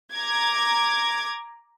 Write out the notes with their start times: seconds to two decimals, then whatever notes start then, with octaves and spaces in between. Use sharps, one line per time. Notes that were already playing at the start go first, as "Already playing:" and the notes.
0.14 A#5 D6 G#6